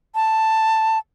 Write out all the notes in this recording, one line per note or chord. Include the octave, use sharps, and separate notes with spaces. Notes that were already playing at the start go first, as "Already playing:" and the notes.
A5